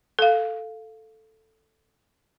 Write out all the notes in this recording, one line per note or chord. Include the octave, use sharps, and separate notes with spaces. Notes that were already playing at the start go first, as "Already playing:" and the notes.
A4 F5